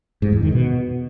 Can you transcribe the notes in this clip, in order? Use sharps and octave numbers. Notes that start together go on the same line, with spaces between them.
G#2
E2
D#3
B2